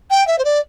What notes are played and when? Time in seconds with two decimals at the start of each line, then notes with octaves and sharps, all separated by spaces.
0.10 G5
0.27 E5
0.38 C5
0.44 D5